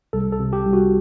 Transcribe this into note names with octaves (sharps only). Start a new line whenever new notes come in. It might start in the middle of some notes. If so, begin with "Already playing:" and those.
C2 A4
A4
C3
G4
C2
F#4